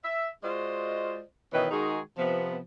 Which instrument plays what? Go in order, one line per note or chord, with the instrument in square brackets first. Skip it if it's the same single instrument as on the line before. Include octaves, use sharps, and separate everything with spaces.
[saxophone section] E5
G#3 F4 F#4 C5 D5 D#5
B2 D#3 E3 C#4 B4
D#3 G#3 D#4 F#4 G#4
C3 F3 B3